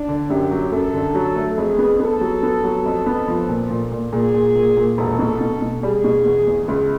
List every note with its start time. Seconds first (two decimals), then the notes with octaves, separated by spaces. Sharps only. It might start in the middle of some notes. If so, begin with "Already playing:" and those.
Already playing: D4
0.08 D3
0.30 F#2 G4
0.51 F#3
0.72 F#2 A4
0.93 D3
1.15 F#3
1.36 A3
1.57 F2 G#4
1.78 B3
2.00 B3 A4
2.21 F#3
2.43 B3
2.64 F#3
2.86 F2
3.06 B3
3.28 F3
3.49 A#2
3.70 A#2
3.92 A#2
4.12 A#2 G#4
4.34 A#2
4.55 A#2
4.77 A#2
4.98 E1 A4
5.19 B2
5.41 B2
5.62 B2
5.83 G3 G#4
6.04 B2
6.25 E2
6.47 E2
6.68 C#2